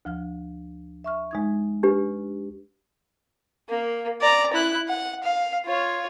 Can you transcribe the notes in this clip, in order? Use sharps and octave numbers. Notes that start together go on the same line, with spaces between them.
D2 F3 F6
E5 C#6 F6
G#3 D#4 G#6
D4 G4 B4
A#3
D5 A#5
E4 F#6
F#5
F5
F4 C#5